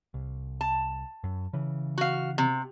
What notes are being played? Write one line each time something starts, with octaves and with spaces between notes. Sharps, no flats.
C2
A5
F#2
C#3 E3
F#4 F5
C3